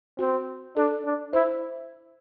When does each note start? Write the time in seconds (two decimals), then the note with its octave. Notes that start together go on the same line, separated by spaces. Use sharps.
0.19 C4 F#4
0.77 D4 A4
1.05 D4
1.33 E4 C5